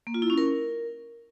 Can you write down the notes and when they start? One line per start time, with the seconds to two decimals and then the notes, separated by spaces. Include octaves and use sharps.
0.07 A#3
0.14 F4
0.22 E4
0.30 C#4
0.38 A#4